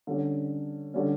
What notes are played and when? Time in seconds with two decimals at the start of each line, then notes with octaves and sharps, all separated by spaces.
0.07 D3 G3 C#4
0.94 D3 G3 C#4